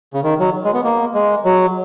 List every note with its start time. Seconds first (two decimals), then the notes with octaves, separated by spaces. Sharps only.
0.14 C#3
0.24 D#3
0.39 F#3
0.64 G#3
0.74 B3
0.84 A#3
1.14 G#3
1.45 F#3